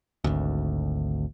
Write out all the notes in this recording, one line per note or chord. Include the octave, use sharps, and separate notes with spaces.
G#1 D2